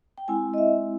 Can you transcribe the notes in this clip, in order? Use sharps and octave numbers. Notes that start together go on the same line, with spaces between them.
G5
G#3 C4 E4 G#5
D#5
E5